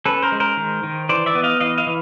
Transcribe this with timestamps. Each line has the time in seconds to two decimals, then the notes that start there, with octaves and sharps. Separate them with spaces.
0.05 C#4 A4 B4
0.22 A#4 C5
0.32 G#3
0.40 A#4 C5
0.57 D#3
0.83 D#3
1.09 E3 C5 D5
1.26 D5 E5
1.35 B3
1.43 D#5 F5
1.60 E3 D#5 F5
1.78 D#5 F5
1.87 E3